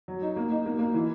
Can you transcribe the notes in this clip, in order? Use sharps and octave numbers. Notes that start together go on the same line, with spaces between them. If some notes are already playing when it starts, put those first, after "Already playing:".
F#3
D#4
A#3
D#4
A#3
A#3
E3